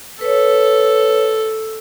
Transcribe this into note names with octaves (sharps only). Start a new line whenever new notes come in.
A4 B4 C#5